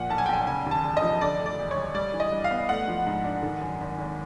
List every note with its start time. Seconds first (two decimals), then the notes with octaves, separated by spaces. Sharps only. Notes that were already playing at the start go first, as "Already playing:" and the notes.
Already playing: A#2 F3 F#5
0.10 B1 A5
0.18 G#5
0.26 G5
0.29 B1 G#5
0.47 C#3 G#5
0.66 D#2
0.71 A5
0.84 E1
0.97 D#5
1.02 F3
1.21 D3 D5
1.39 D2
1.46 D5
1.59 E1
1.71 G3 C#5
1.95 G3 D5
2.14 E3
2.20 D#5
2.32 G2
2.44 F5
2.51 B3
2.69 A3 F#5
2.88 F3
3.07 G#2
3.24 D4
3.43 D#3
3.61 F#2
3.81 G#1
3.98 G#1